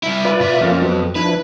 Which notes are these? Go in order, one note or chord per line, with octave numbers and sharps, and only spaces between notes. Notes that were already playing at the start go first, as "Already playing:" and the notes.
G3 E4
F4 B4 D5
B2 E5
F2 A#3 C#4 F4
F#3 B3
F3 D4 E4 B4